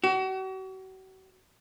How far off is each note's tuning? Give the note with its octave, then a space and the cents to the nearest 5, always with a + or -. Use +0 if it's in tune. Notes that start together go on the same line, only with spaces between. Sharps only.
F#4 +40